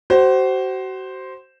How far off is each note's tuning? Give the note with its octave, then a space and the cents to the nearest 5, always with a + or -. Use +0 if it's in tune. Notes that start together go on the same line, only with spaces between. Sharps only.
F#4 +35 C5 +0